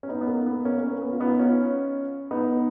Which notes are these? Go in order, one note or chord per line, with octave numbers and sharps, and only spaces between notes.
C#4
B3 D#4
B3
A#3
B3
A#3 C#4
A#3 C#4
B3
F4
B3 D#4
C#4 F4
B3 D#4